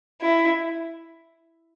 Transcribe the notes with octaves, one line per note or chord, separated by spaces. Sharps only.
E4